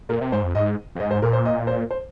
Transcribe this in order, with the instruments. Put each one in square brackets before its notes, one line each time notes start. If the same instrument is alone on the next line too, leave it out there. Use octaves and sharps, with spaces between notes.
[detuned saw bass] A#2 [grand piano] A#4
[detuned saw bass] C3
[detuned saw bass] G#2 [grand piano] C5
[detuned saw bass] F2
[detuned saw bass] G#2 [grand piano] D#5
[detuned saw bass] F2
[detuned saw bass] G#2 [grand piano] D#5
[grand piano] C5
[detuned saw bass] A#2 [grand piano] A#4
[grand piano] C5
D#5
C5
C5